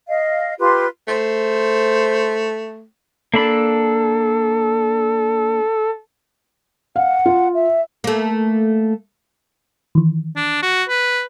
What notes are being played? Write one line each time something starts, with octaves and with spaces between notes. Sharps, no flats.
D#5 F5
F4 G4 B4 C6
A3 C5
A#3 D4 A4 B5
F5 F#5
F4
E5
A3 A#3
D#3 E3
D4
F#4
B4